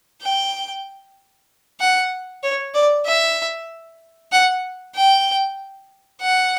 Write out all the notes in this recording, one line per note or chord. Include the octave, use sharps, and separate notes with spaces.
G5
F#5
C#5
D5
E5
F#5
G5
F#5